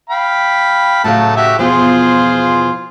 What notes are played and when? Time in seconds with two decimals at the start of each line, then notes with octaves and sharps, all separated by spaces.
0.10 F5 G5 B5
1.04 A2 C#3 F#3 A3 F5 A5
1.36 F#4 G4 E5
1.59 E2 B2 F3 F4 G#4 C5